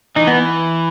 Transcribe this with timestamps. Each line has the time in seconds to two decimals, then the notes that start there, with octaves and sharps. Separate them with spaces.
0.16 E3 D#4
0.27 B3